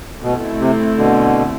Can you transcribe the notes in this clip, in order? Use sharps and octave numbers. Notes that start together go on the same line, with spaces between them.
B2 A3 C4 E4
C3
B2 D3